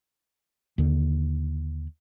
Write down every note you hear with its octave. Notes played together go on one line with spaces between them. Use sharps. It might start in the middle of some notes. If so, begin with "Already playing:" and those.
D#2 D3